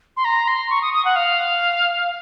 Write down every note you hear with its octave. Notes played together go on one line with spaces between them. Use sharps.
C6
A#5
C6
C#6
D#6
D#6
F#5
F5